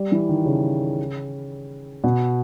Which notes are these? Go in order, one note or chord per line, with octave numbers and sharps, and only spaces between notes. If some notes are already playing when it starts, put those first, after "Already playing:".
Already playing: G3
E3
D#3
C#3
B2